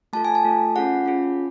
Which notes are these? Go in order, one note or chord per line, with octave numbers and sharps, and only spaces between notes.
A3 F4 A4 A5
G#5
A5
A3 F4 A4
C#4 F4 G#4 F#5
C#4 F4 G#4